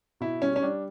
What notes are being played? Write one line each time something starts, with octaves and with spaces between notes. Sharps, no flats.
B2 E4
G3 C#4
C#4
G3 D4